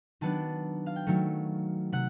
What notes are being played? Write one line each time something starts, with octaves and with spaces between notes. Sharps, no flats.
D#3 F#3 B3 D4 A5
F5
G5
D#3 F#3 A3
C3 F#5